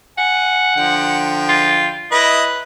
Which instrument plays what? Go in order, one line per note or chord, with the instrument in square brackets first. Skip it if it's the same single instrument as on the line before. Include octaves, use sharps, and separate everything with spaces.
[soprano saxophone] F#5 [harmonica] G#5
[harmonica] D3 F3 G5
[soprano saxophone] F4
[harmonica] E4 D#5 [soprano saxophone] B4